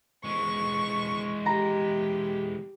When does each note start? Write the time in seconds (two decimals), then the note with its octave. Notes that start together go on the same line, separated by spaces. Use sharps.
0.24 E3 G#3 C#6
1.46 G4 A#5